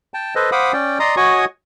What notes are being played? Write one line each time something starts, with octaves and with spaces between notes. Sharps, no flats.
G5 A5
A4 B4 C5 D#5
C5 F5 F#5 B5 D6 D#6
C#4 D5 G5
D5 D#5 A#5 C6 D#6
F#4 C#5 D#5 G#5 C#6 D#6